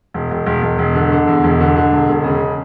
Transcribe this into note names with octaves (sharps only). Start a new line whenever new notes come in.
E1
E1
E1
E1
E1
D3
D3
E2
E1
D3
D3
E1
E1
C#3